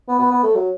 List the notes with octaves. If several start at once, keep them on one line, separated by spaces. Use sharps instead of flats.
B3
B3
B3
A3
F#3